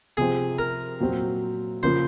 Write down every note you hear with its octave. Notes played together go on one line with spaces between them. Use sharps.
C3 F3 C4 G#4
A#4
A#2 F#3 C4 F#4
C#3 F3 A#3 F4 C5